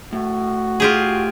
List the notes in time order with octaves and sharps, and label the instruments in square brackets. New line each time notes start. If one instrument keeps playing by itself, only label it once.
[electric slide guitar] A2 [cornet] F#4
[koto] F4 G4 G#4